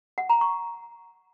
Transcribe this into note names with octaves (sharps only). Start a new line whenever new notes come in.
F#5
A#5
C#6